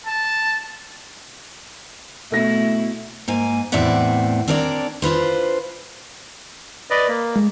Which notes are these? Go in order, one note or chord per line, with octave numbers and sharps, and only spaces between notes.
A5
B2 A3 E4 A#6
G#2 A#3 G#5
E2 A2 C4 D5 E5 F#5
C4 D4 A#4 C#5 D5
D4 F4 B4 C5
B4 D5 D#5
A#3
G#3